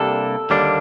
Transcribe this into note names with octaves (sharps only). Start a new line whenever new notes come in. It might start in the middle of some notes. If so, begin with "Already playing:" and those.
Already playing: C3 G3 A#3 D4 A4
D#2 D3 G3 A#3 D4